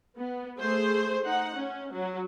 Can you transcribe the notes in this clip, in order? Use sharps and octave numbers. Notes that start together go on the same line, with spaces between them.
B3
A3 G#4 C5
D#4 F#5
C#4
F#3